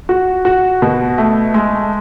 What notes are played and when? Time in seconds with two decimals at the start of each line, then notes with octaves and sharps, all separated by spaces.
0.09 F#4
0.45 F#4
0.82 B2
1.18 A3
1.54 G#3